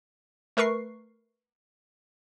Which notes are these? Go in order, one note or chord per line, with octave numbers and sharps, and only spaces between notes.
A3 A#4 B4 C#6 C7